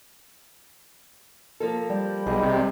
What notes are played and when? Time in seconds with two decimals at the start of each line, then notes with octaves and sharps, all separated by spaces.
1.60 F3 A#3 A4
1.90 G3
2.26 B1 G#4 D#5
2.43 C3